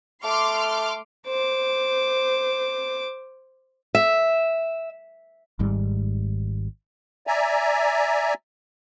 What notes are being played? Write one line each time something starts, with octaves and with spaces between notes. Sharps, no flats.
A3 C6 D6 F6
C5 D6
E5
G#1 G#2 G3
D5 E5 G#5 A#5